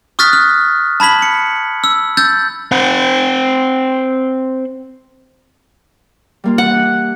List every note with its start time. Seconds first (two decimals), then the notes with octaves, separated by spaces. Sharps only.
0.19 C#6 D#6 F6 F#6 A6 B6
0.33 F6
1.00 A5 B5 G#6 B6 F#7
1.22 C#7
1.84 E6
2.17 E6 G6 A6
2.71 C4 C5 F#5
6.44 G3 A#3 F4
6.58 E3 F#5
6.74 D4